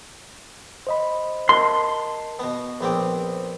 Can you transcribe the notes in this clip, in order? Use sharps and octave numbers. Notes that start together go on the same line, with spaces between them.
C5 D#5 B5
A#4 D#5 A5 C6
B2 B3
A#1 B3 C4 D6